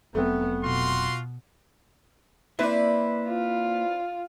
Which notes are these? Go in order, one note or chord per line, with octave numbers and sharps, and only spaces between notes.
F1 F#3 A3 B3 C4
B2 F4 F#4 C6
A#3 C4 E4 B4 D5 E5
F4